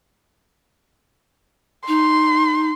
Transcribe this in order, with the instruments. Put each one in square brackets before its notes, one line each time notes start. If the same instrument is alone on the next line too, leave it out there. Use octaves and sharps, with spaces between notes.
[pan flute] D#4 [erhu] C6